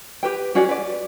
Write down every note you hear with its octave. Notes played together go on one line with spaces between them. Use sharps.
G4 B4 G5
C#4 F#4 G#4 D5
B4 D5